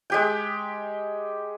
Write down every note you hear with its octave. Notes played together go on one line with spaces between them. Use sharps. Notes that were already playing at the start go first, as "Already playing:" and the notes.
G#3 G4 G5